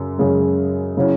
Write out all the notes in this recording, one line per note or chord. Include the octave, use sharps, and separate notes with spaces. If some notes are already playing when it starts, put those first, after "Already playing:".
Already playing: F#2 C#3
F#2 C#3 G#3
C#3 F#3 C#4 E4